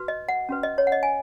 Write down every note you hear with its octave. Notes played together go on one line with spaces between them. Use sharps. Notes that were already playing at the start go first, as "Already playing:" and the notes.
Already playing: F#4 B4
D#5
F#5
C#4 F#4 B4
D#5
C#5
F#5
D#5
G#5